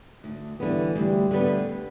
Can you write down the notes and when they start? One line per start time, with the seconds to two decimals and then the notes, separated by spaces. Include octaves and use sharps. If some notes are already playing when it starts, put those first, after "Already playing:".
0.24 D2
0.60 D3 E3 G3 B3
0.95 D2 G3
1.31 D3 G3 A3 B3